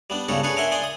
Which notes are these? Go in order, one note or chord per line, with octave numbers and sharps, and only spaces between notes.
G3 B3 D4
C#2 G2 C#3 B3 A4 C#5
D4 G#4 B4 C#5 C#6
A#4 C#5 E5 F#5 G#5 C6
D5 G#5 C6 D#6
D#6